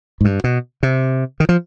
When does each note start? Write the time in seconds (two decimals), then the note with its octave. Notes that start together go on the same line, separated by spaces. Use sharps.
0.21 G#2
0.25 G2
0.44 B2
0.83 C3
1.40 D#3
1.49 F3